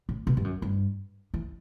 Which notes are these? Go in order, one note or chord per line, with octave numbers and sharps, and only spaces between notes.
A2
B2
G2
F#2
G2
E3